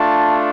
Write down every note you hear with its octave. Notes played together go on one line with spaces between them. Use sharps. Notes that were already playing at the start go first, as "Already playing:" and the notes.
Already playing: A3 D4 F4 A5